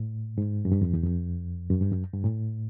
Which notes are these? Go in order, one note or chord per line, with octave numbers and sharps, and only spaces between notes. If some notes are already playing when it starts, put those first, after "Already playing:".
Already playing: A2
G#2
F#2
G2
F2
E2
F2
F#2
G2
F#2
G2
A2